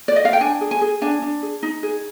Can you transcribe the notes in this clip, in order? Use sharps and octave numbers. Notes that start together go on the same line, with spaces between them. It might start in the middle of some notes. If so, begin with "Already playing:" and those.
D5
D#5
F5
G5
D4 G#5
G#4
G#5
G#4
D4 G#5
D4
G#4
D#4
G#4